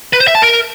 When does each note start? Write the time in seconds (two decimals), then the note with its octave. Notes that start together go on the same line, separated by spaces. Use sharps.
0.13 B4
0.20 C5
0.28 E5
0.35 A5
0.42 A#4